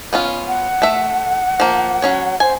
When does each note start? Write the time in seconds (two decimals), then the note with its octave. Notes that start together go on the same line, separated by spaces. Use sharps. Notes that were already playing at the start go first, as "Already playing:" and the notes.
0.13 B3 C#4 F4
0.47 F#5
0.82 A3 E5
1.60 F3 A#3
2.02 F#3 C#4 C#5
2.40 C5 G#5